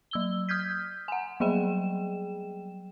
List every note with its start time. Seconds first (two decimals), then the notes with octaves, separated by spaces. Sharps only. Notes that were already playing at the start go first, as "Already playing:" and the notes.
0.11 F#3 E6 G7
0.49 D#6 F6 G6 G#6 B6
1.08 F#5 G#5
1.40 F#3 G3 G#4 G5 E7